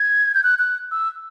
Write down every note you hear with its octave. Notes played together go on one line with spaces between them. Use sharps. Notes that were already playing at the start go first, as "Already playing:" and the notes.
Already playing: G#6
G6
F#6
F#6
E6